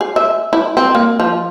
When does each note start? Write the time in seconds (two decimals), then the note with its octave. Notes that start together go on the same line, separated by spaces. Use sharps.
0.01 G#4
0.16 E5
0.53 E4
0.77 C4
0.95 A#3
1.20 F3